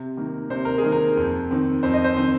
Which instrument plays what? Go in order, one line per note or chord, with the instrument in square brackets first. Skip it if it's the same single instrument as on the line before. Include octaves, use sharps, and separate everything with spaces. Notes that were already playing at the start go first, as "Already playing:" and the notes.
Already playing: [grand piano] C3
D#3 A#3
C3 C5
A#4
G#4
D#3 A#3
A#4
F2
D#3 C4
F2 C5
D#5
C5
D#3 C4